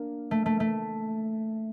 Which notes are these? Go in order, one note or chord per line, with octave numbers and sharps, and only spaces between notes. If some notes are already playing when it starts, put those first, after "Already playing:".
Already playing: A#3 D4
A3
A3
A3